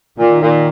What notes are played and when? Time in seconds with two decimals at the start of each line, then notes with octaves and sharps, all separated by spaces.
0.18 A#2 D#3
0.41 A#2